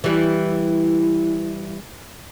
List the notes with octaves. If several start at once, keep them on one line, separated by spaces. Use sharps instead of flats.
E3 G3